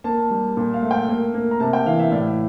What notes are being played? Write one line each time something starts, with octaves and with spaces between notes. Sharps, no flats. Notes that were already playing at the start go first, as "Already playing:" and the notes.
A#3 A5
G3
A#2
F5
A3
G5
A#3
A#3
A#5
C3 A5
G5
E3 F5
E5
A2 D5